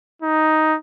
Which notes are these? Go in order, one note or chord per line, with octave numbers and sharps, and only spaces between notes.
D#4